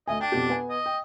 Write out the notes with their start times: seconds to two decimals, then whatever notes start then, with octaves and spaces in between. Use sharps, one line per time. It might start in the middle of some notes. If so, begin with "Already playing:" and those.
0.08 D2 D#5 E5 G#5
0.21 D4 G5
0.32 F2 B2 G4
0.50 B3 G#5
0.69 D#5
0.86 G5